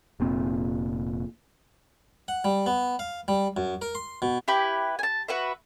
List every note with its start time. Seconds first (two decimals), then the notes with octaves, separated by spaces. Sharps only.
0.20 F1 A#2 C4
2.28 F#5
2.44 G3
2.66 B3
2.99 F5
3.28 G3
3.57 F#2
3.82 A#4
3.95 C6
4.22 B2
4.48 E4 G4 B4
4.99 G#5 A5
5.28 F#4 B4 E5